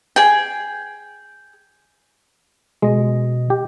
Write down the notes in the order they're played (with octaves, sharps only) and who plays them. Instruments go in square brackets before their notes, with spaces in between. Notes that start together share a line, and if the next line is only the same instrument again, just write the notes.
[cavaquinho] G#4 G5
[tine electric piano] B2 D#5 [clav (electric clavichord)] G#3
[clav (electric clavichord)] G4